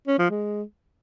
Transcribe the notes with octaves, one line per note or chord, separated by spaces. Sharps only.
C#4
F3
G#3